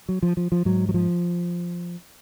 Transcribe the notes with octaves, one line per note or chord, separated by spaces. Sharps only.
F#3
F3
F3
F3
G#2 F#3
F#3
F3